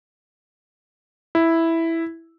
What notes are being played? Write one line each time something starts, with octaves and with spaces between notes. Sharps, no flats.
E4